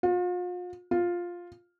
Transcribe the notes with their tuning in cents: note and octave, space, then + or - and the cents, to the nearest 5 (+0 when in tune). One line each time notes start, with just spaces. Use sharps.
F4 +40
F4 +5